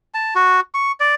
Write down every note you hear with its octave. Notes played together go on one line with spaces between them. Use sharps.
A5
F#4
C#6
D5